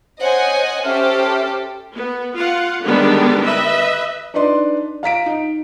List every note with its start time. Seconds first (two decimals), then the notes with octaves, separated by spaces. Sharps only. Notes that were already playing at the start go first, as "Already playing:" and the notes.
0.19 C5 C#5 D#5 F#5 G#5
0.84 C#4 G4 A4 C5 E5 F6
1.95 B3
2.35 F4 F5 F#5
2.84 D3 D#3 G3 G#3 B3 D4
3.45 B4 D#5 E5
4.34 D4 D#4 B4 D5 C6
5.03 F5 A#5 B6 D7
5.26 D#4